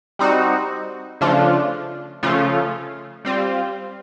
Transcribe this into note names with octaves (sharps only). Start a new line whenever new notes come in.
G3 C4 D#4 F#4
C#3 F3 A3 D4 F4
C#3 F3 A3 C#4 F4
G3 C4 F4